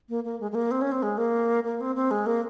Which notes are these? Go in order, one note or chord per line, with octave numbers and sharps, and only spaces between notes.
A#3
A#3
G#3
G#3
A#3
C4
C#4
C4
G#3
A#3
A#3
C4
C4
G#3
A#3